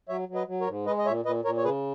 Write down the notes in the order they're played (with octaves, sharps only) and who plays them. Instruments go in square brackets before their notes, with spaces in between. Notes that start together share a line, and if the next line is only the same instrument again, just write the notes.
[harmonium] F#3 C#5 E5
F#3
B4 D#5
F#3
A#4 C#5
G#2
G#3 B4 D#5
D#5
A#2 C#5 E5
A#2 B4 D#5
A#2 A#4 C#5
C#5
C#3 G#4 B4